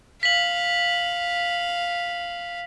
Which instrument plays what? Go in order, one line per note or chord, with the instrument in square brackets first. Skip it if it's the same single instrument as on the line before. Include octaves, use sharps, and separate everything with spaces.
[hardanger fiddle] F5 [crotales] B6 F#7